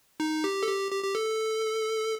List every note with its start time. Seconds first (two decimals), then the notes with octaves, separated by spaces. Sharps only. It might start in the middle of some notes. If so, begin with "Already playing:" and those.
0.20 D#4
0.44 G4
0.63 A4
0.67 G4
0.91 G4
1.04 G4
1.15 A4